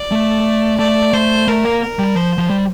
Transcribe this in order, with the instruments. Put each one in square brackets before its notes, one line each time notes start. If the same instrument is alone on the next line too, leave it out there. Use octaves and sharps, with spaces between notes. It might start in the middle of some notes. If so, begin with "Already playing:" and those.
Already playing: [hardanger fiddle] D5
[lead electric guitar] A3
[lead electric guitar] A3 [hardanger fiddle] D5
[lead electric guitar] A3 [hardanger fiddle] C5
[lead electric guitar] A3 [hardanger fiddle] A#4
[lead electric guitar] A#3
[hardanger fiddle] A#4
[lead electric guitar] G3
[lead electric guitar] F3 [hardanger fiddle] C5
[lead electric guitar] F3
G3